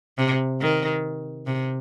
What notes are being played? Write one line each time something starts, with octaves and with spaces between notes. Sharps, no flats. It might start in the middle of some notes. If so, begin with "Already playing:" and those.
C3
D#3
C3